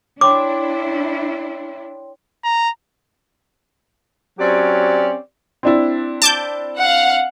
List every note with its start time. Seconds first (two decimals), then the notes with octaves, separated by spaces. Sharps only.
0.21 D4 E4 C#5 G5 C6 D6
2.44 A#5
4.39 F#3 C4 C#4 G4 D5
5.63 C4 D4 E4
6.22 A5 D6 G6
6.79 F5 F#5